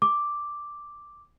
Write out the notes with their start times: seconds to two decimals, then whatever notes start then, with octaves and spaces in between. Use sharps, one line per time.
0.02 D6